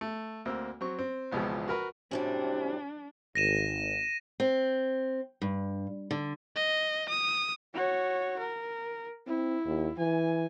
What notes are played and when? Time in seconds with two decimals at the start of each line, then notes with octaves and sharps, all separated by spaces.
0.01 A3
0.45 D2 A#3 C4 E6
0.81 F#3 C4 C#6
0.99 C4
1.32 G#1 C#2 B2 E3 F3 G#3
1.68 F#4 A#4 B4
2.11 F#2 A2 C3 G3 D4
3.35 G#1 A#6 D#7 E7
4.40 C4
5.42 G2
6.11 D3
6.56 D#5
7.09 D#6
7.74 F#4 C#5
8.38 A#4
9.27 C4 E4
9.65 D#2
9.98 E3 G#5